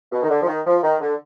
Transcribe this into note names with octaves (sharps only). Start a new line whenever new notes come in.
B2
D#3
D3
F3
D#3
F3
D#3
D3